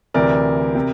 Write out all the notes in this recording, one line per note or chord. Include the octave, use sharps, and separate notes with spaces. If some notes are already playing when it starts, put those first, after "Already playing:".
D2 C3 E3 A#4 D5
C3